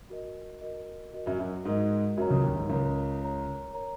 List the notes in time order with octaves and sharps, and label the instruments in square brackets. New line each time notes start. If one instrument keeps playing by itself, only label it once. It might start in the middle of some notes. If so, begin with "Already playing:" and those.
[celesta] F#4 A#4 D#5
F#4 A#4 D#5
F#4 A#4 D#5
[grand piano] F#2 F#3
F#2 F#3
[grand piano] G#2 G#3 [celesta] F#4 A#4 D#5
[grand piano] F#2 F#3 [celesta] A#4 C#5 A#5
[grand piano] C#2 C#3
D#2 D#3
G#2
[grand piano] C#2 C#3 [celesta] A#4 C#5 A#5
[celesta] A#4 C#5 A#5
A#4 C#5 A#5